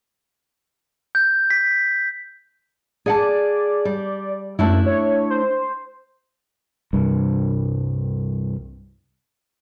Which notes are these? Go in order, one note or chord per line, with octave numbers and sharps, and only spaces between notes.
G6
B6
G#4 D5 F#5 A5
G3
F#2 A3 D4 E4
C#5
C5
C2 G2